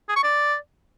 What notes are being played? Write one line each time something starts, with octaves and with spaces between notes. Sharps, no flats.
G#4
C#6
D5